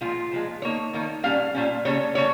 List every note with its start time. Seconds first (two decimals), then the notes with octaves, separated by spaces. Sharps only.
0.01 A#2 F3 G#3 F4
0.31 A#2 F3 G#3
0.62 D#3 A#3 D#4 C#5
0.93 D#3 A#3 D#4
1.23 A#2 G3 C#4 F5
1.55 A#2 G3 C#4
1.85 C#3 G3 A#3 C#4 C#5
2.15 C#3 G3 A#3 C#4 C#5